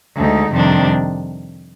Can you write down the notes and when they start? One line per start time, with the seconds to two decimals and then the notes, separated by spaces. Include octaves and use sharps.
0.17 D2 D3 G#3 D#4
0.52 F2 C3 D#3 G3 D4